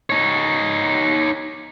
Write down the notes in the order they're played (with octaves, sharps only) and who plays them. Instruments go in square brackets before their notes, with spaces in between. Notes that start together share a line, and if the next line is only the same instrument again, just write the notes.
[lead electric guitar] D#4 C#5